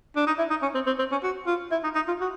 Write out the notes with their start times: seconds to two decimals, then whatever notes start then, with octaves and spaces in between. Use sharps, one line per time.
0.16 D4
0.27 D#4
0.39 E4
0.50 D#4
0.62 C#4
0.75 C4
0.87 C4
0.99 C4
1.12 C#4
1.23 F#4
1.47 F4
1.72 E4
1.84 D#4
1.95 D#4
2.08 F4
2.21 F#4